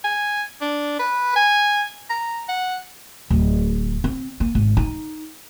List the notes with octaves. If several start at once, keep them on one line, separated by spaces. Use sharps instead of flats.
G#5
D4
B4
G#5
A#5
F#5
D1
C4
A#3
G#1
D#4